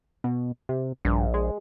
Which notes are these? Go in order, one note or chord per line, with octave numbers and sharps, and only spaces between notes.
B2
C3
A#1 G2
G#3